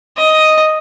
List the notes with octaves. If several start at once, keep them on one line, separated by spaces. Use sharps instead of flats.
D#5